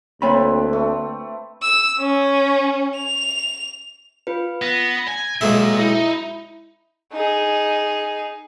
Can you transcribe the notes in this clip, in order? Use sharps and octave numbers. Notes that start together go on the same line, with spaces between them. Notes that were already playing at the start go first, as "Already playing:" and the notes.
D2 A#3 C4 B4 C#5 B5
A3
E6
C#4
F7
F4 B4
B3 A#6
G#5
B1 A#2 G#3 E5
D#4 E4
D#4 G#4